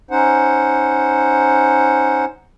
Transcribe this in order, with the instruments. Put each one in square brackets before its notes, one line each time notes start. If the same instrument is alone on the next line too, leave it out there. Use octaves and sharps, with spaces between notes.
[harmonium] C#4 D#4 C5 F#5